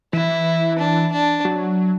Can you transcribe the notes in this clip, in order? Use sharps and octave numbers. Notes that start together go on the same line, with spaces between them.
E3 E4
D4
D4
F#3